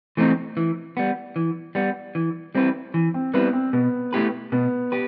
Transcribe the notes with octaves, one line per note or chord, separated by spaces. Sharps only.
E3 A3 C4 D#4
E3
G3 B3
E3
G3 B3
E3
G3 C4 E4 B4
E3
C4
G3 B3 C4 E4 B4
C4
B2 B3
A3 E4 G4 B4
B2 B3
G4 B4